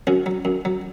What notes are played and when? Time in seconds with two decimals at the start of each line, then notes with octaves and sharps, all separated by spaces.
0.07 F#2 C#4 F#4
0.26 F#3
0.45 F#2
0.65 F#3